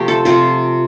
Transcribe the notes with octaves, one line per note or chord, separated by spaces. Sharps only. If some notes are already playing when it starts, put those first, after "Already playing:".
Already playing: C3 F3 A3 G4
A4
C3 F3 C4 F4